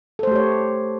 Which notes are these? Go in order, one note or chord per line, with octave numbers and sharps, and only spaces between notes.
A3 G4 A4 C5 C#5